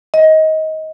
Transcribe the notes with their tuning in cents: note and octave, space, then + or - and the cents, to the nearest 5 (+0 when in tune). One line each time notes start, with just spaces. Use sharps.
D#5 +20